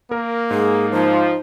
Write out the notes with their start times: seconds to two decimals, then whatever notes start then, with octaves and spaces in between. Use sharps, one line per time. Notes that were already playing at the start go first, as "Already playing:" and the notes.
0.11 A#3 A#4
0.51 G#2 G#4
0.92 F3 D#4